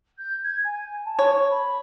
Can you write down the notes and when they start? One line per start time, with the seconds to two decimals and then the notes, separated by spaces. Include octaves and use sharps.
0.18 G6
0.43 G#6
0.64 G#5
1.05 A5
1.19 C#5
1.49 B5